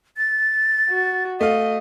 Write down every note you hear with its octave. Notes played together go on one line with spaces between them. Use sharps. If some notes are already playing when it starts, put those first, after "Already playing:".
A6
F#4
A3 D#5 F5